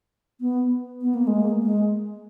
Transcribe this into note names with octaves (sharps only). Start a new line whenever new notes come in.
B3
B3
A#3
G#3
A#3
G#3